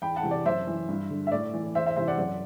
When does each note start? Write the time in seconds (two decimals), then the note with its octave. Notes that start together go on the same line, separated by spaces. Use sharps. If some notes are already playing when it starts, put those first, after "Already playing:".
0.02 E2 G5 B5
0.16 F#5 A5
0.23 C3 E3
0.31 D5
0.45 F#2 C5 E5
0.67 E3
0.89 G2
1.10 D3
1.27 E5
1.32 A2 D5
1.54 E3
1.75 E2 C5 E5
1.86 C5 E5
1.96 C3 E3 C5 E5
2.08 D5 F#5
2.18 F#2 D5 F#5